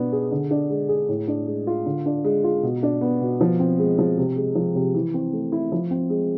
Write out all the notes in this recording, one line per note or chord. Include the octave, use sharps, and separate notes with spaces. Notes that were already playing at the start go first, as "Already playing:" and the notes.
Already playing: B2 B3 D4
G#4
D3
D4
G#3
G#4
A2
D4
G#3
F4
D3
D4
G#3
F4
B2
D4
B3
B2
F3
C4
G#3
F3
C3
G#3
F3
C3
E3
C4
A3
E4
F3
C4
G#3